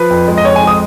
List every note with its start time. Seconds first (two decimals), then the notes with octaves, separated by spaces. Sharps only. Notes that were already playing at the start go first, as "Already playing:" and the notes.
Already playing: F3 B4
0.10 F2
0.28 G#3
0.38 D#5
0.44 F2 C#5
0.56 G#5
0.62 G#3
0.67 D#6